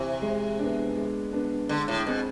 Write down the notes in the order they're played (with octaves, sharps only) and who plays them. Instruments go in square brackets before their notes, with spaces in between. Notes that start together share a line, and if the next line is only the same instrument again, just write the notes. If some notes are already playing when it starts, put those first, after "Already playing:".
Already playing: [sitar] C3 E3
[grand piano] G#3
B3 D4
G#3
B3 D4
[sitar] D3 [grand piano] G#3
[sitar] A2
[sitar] B2 [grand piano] C4 G#4